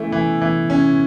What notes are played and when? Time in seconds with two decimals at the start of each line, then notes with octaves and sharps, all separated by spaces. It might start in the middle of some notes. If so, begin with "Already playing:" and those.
Already playing: E3 A3 C#4 E4
0.12 E3
0.42 E3
0.70 C#4